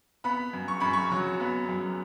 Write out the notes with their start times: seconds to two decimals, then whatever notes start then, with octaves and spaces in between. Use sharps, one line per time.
0.24 B3 B5
0.53 F#2
0.68 C#6
0.80 F#2 B5
0.93 C#6
1.12 F#3
1.40 B3
1.69 F#2